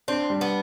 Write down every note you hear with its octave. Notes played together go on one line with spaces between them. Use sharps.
C4 D4
G3
B3